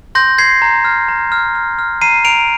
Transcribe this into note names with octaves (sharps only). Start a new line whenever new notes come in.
C6 G6 A#6
C6 G#6 C7
A#5
F6
A#5
F6
F6
F6
A#5 C7 D#7
A#5 D7 F7